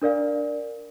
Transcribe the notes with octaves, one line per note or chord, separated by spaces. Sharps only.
D4 A#4 D5 F5